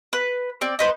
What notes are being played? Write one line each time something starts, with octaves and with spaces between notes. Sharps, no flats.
B4
C4 D5
D#4 B4 C5